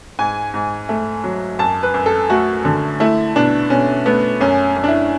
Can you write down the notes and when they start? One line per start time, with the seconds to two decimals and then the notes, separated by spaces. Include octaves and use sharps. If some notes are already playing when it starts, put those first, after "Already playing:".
0.19 G#2 G#5
0.54 G#2
0.89 A3
1.24 F#3
1.59 F#2 A5
1.83 B4
1.94 F#2
2.06 A4
2.30 A3 F#4
2.65 D3
3.00 A3 E4
3.36 B2 D4
3.70 B2 C#4
4.06 A3 B3
4.41 F#2 C#4
4.77 F#2
4.84 D4
4.88 E4